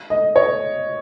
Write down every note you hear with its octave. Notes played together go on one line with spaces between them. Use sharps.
D#5
C#5